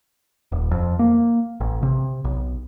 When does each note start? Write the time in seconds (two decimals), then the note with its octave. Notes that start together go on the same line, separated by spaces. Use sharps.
0.52 D#1
0.71 F2
0.99 A#3
1.60 A1
1.83 C3
2.24 B1